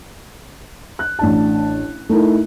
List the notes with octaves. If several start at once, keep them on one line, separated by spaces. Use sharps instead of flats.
F#6
A1 D4 A5
A3 D#4 E4 A#4